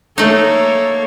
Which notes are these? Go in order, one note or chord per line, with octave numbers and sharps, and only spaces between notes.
A3 A#3 D#4 A4 C#5